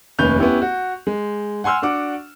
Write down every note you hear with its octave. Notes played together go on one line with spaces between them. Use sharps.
F1 D#2 C#4 B4 G6 F7
B3 C#4 E4 G4
F#4
G#3
F#5 G#5 C6 E6 F6
D4 F#4 F#5 D6